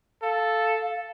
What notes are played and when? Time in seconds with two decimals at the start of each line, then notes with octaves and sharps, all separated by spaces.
0.23 A4 F5